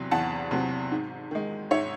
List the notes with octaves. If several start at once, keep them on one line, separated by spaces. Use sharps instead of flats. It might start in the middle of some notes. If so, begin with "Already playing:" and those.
Already playing: E2 C3 F#3
E2 F#5 A5
C3 F#3
G#2
D#3 G#3
G#2 C#5 E5